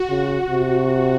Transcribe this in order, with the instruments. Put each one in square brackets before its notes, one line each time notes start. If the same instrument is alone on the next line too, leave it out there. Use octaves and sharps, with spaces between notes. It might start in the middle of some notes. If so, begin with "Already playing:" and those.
Already playing: [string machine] F#4
[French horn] C#3
[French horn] C3 [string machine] F#4